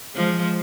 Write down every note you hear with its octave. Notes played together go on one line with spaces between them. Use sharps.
F3 G#3